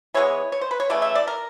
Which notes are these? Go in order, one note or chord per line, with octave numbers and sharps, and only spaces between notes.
E3 G#3 B3 C#5
C#5
C5
B4
C#5
C#3 E3 A3 D5
E5
D5
A#4